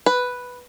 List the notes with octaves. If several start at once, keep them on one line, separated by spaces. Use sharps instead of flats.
B4